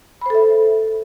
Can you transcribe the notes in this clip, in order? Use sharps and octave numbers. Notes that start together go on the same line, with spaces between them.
A4 C5 E5 B5